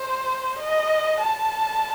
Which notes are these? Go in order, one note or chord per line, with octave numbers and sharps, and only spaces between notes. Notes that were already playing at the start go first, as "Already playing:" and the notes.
Already playing: C5
D#5
A5